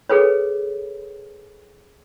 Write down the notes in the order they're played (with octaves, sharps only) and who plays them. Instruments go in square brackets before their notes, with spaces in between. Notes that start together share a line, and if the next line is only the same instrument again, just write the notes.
[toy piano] G#4 A4 B4 C#5